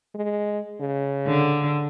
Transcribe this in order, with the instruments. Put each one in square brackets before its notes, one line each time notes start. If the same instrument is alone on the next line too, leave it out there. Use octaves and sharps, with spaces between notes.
[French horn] G#3
C#3
[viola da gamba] D3